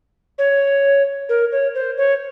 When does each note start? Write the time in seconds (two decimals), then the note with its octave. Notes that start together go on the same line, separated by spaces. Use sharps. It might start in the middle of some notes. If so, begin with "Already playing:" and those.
0.38 C#5
1.29 A#4
1.52 C#5
1.75 C5
1.98 C#5